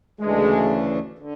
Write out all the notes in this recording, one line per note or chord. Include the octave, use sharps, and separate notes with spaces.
D2 C#3 E3 G#3 A3 D4
D3